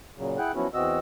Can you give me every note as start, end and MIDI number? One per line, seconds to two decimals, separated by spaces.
0.18 0.38 46
0.18 0.38 49
0.18 0.38 54
0.38 0.52 64
0.38 0.52 68
0.38 0.52 78
0.38 0.52 79
0.38 0.52 90
0.55 0.68 53
0.55 0.68 54
0.55 0.68 59
0.55 0.68 61
0.55 0.68 64
0.55 0.68 66
0.74 0.99 40
0.74 0.99 52
0.74 0.99 60
0.74 0.99 66
0.74 0.99 75
0.74 0.99 88